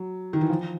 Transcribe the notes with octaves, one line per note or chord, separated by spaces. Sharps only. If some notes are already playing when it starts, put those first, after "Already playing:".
Already playing: F#3
D#3
E3
F3